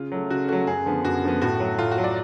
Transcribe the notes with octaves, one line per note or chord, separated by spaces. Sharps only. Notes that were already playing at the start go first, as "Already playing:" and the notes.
Already playing: C#3 F4
F#3 A3
C#3 F#4
F#3 A3 F#4
F#2 G#4
D3 F3 B3
F#2 F#4
D3 F3 B3
A2 F#4
F#3 A3
A2 F4
F#4
F#3 A3
D5